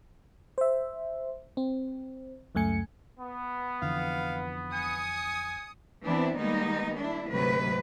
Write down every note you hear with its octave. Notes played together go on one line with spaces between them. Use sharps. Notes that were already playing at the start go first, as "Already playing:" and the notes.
C5 E5
C4
C#2 F#2 A3 G#5 C#7
B3
F2 D3 E3 F5
G#5 D#6 C#7
E3 B3 C4 D4 E4
D#3 G3 G#3 A#3 B3 D#4
D4 E4
D2 G#2 C3 D#3 F#3 B4